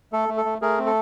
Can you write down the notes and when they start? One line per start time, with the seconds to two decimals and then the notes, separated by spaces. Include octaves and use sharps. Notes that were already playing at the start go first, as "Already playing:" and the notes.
0.12 A3 A4
0.29 A3
0.37 A4
0.45 A3
0.62 A3 G#4 A#4
0.78 C4
0.86 A4